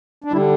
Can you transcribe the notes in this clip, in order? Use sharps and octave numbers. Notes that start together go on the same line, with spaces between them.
D4
D3 G3 E4